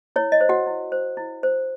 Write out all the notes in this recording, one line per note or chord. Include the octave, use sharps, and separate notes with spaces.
E4 C#5
D#5
C5
F#4 F#5
E4
C5
E4
C5